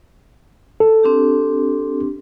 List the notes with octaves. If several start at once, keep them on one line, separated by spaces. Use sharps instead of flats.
A4
C4 D4 G4